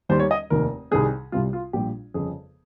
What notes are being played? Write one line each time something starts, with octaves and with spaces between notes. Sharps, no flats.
D#2 D#3 G3 C5
C#5
D#5
F1 D#2 D#3 A#4
C2 C3 D#3 G3 G#4
C2 C3 G3 F4
F4
A#1 A#2 G3 G4
G1 F2 C#3 G#4